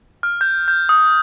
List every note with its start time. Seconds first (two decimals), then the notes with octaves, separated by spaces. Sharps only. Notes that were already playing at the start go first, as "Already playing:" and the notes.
0.23 F6
0.41 G6
0.68 G6
0.89 D#6